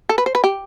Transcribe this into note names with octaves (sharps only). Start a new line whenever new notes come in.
A4
B4
C5
B4
G4